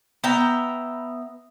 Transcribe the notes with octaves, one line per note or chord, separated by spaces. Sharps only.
B3 E5 G5 A#5